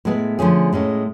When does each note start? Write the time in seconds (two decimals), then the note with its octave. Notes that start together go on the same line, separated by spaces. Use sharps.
0.05 A2 G#3 B3
0.39 D3 F3 A3 C#4 G#4
0.73 A2 G#3 C#4